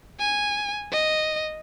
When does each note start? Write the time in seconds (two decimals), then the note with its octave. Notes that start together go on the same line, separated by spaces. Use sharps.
0.20 G#5
0.92 D#5